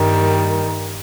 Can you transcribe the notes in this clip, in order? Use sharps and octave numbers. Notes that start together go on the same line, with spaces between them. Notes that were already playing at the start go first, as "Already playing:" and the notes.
Already playing: G2 D#3 G3 A#3